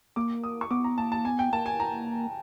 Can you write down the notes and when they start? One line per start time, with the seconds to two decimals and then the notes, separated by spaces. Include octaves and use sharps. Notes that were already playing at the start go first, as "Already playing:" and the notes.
0.16 A#3 D6
0.44 D#6
0.61 C#6
0.71 B3 D6
0.84 A#5
0.98 A#3 A5
1.12 A5
1.25 B3 G#5
1.39 G5
1.53 A#3 A5
1.66 G#5
1.80 A#5